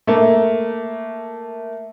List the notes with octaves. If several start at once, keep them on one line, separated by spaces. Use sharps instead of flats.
A3 A#3